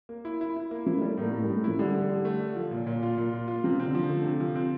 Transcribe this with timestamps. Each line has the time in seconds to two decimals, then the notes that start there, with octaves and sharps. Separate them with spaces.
0.09 A#3
0.25 E4
0.41 E4
0.56 E4
0.71 A#3
0.86 F3 E4
0.98 A3
1.02 G3
1.17 A2 A#3
1.32 A2 A#3
1.44 G3
1.49 A2
1.56 A3
1.64 F3 E4
1.79 D3 G3
1.94 D3
2.09 D3
2.25 A3
2.40 D3
2.55 F3
2.71 A#2
2.87 A#2
3.03 F4
3.18 A#2
3.33 F4
3.48 F4
3.64 C3 F3
3.80 C4
3.86 D3
3.95 F3
4.09 D3 A3
4.25 C3
4.40 F3
4.55 C4